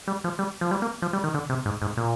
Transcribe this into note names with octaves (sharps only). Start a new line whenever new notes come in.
G3
F3
G3
F3
G3
A#3
F3
G3
D#3
D3
C3
G#2
G#2
A#2